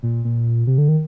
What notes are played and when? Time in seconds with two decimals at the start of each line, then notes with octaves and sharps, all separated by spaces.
0.03 A#2
0.25 A#2
0.67 C3
0.78 D3
0.89 D#3